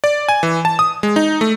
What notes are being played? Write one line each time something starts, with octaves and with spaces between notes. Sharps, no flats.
D5
G#5
E3
A5
D#6
G#3
D#4
A3